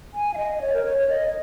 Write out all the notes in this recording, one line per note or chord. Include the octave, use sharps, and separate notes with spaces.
G#5
F5
D#5
D#5
C#5
A#4
C#5
C#5
D#5